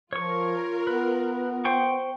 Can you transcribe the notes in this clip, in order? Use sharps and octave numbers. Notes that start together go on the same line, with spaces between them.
F3 F4 A#4 C#5 C#6
B3 B4
C5 G5 C#6